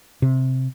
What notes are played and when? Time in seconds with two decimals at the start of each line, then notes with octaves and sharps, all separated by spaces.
0.22 C3